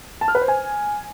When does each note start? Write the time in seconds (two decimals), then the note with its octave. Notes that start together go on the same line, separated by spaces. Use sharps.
0.21 A5
0.28 F6
0.35 B4
0.41 C5
0.48 G#5